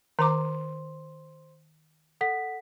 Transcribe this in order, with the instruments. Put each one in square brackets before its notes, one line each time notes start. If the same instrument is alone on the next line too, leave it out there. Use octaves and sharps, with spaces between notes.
[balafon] D#3 A#5 D6 [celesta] C5 C6
[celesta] A4 F#5 B6